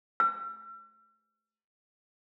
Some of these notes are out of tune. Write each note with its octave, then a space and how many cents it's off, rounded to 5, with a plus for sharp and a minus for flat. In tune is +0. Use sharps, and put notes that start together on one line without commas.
E6 +45